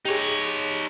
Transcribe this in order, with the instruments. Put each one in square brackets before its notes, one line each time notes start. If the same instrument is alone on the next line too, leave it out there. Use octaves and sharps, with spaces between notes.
[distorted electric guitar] D#4 C#5 [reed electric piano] G4 G#4